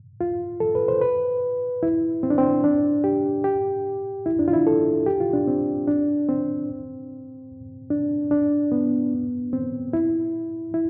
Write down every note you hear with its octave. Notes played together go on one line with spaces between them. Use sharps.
F4
A4
B4
C5
B4
E4
C4
D4
C4
D4
G4
G4
E4
D4
F4
E4
A4
G4
F4
D4
C4
D4
C4
D4
D4
B3
C4
E4
E4